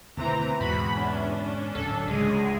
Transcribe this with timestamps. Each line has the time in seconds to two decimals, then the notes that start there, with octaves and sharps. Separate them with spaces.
0.17 D2 B2 D#3 E3 C4 A#5
0.61 E2 G#2 B2 D3 F#4 B5
0.93 C#4 D4
1.75 D1 D2 F#3 A4
2.07 C#2 G#3 G#4